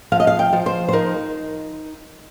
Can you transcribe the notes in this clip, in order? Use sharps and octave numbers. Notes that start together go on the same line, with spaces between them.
F3 F5
D#5
F5
G5
F3
C5
C5
D#4 A#4